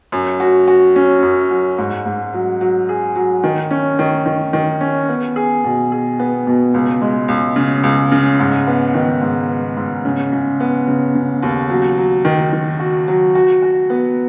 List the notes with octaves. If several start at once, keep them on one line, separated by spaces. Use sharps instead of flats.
F#2
F#4
F#4
C#4
F#2
F#3
G#2
G#2
F#3
F#3
G#4
F#3
D#3
C#4
D#3
D#3
D#3
C#4
B3
G#4
B2
G#4
B3
B2
C#2
G#3
C#2
C#3
C#2
C#3
G#2
B3
D#3
G#2
B3
G#2
C#3
C#3
B3
C#3
C#3
D#2
F#3
F#3
D#3
D#3
F#4
F#3
F#4
F#4
B3